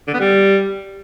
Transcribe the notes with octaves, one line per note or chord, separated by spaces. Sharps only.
D3
B3
G3